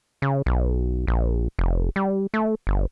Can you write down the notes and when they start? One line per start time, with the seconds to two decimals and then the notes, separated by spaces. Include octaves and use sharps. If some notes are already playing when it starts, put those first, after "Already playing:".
0.22 C#3
0.46 B1
1.07 A#1
1.59 F1
1.96 G3
2.34 A3
2.67 G1